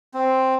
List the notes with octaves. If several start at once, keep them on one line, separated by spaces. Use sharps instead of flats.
C4